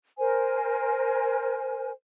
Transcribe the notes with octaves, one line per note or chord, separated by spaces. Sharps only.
A#4 C5 G#5